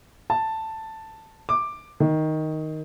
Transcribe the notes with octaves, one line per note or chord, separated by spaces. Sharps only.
A5
D6
D#3